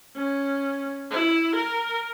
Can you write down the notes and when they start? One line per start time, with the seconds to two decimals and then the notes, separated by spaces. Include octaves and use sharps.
0.16 C#4
1.10 E4
1.56 A#4